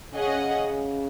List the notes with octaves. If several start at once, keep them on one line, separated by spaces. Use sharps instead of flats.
C#3 C#4 G#4 D#5 F#5